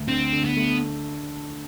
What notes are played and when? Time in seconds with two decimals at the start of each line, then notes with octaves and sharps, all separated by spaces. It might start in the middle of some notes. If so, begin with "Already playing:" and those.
Already playing: D2
0.08 D3 C4
0.33 D3
0.45 B3
0.57 A3